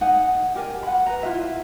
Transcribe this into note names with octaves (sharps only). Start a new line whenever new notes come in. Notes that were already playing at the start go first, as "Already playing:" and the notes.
D#4 F#5 G#5
G4 A#4 D5 G#5
F#5 B5
B4 D#5 A#5
E4 F4 G#4 E5